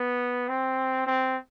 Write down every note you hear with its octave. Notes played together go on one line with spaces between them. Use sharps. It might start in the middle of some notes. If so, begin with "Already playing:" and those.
Already playing: B3
C4
C4